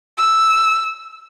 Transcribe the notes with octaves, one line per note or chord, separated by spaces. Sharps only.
E6